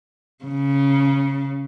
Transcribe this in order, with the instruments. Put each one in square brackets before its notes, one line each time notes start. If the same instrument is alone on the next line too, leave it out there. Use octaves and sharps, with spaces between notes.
[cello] C#3